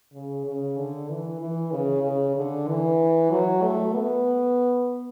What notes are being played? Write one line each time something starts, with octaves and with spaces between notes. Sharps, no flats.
C#3
C#3
D3
E3
E3
C#3
C#3
D3
E3
F#3
A3
B3